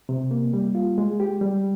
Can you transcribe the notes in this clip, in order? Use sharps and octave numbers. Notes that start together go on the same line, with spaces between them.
C3
A#3
G3
F4
G#3
G4
G3